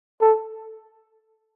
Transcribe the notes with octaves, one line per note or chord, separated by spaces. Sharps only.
A4